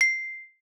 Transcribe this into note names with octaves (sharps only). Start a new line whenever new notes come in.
C7